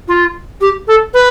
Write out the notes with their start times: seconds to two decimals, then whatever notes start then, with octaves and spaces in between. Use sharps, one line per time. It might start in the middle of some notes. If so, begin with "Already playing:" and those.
0.08 F4
0.61 G4
0.88 A4
1.14 B4